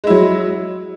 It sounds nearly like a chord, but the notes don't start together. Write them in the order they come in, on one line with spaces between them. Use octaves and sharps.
G#3 E4 F#3